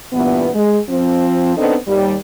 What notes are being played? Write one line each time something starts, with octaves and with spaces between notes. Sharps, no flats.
G2 A#2 E3 B3
G#3
F3 C4
B3 C4 D4 D#4 A4 D#5
D#2 G3